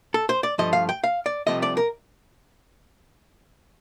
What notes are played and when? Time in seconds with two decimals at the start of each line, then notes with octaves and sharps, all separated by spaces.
0.14 A4
0.29 C5
0.43 D5
0.58 G2 F3 A3 D#5
0.73 F5
0.89 G5
1.04 F5
1.26 D5
1.47 C2 C3 F3 A3 D#5
1.63 D5
1.77 A#4